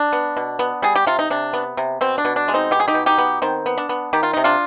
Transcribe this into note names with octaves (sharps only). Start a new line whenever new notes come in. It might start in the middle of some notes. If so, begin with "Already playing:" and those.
Already playing: D4
B3
B2
B3
G3 G#4
G4
C3 F4
D#4
C3 D4
B3
C3
B2 C4
D4
B2
D4
G#3
C4 D#4
B2 G4
G#4
D#4 G4
B2
D#4 G4
B3
D#3 C4
B3
D4
B3
D#3 G4
F4
C3 D#4
D4 F4